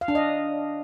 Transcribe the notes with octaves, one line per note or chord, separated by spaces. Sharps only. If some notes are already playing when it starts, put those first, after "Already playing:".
F5
D4
D#5